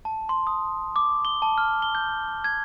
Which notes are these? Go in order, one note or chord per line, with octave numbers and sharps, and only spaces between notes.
A5
C6
D#6
D6
G7
A5
F6
G7
G6
G#6